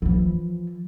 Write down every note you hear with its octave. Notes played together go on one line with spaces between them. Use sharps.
E3 F3